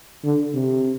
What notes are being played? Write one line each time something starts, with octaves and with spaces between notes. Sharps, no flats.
D3
C3